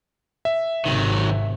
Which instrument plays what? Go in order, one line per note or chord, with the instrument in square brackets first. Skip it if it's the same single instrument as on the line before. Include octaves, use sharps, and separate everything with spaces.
[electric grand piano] E5
[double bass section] G#1 C3 [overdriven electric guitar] D#3 F#3